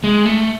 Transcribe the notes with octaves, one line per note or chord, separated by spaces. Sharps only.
G#3
A3